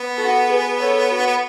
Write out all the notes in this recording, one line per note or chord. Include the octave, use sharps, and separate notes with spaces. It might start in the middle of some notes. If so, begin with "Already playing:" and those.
Already playing: B3
F#4 A4
G#4 B4
A4 C#5
F#4
B3